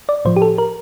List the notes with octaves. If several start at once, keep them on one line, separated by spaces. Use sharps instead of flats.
D5
A2 F3 C5
G4
A4
A#4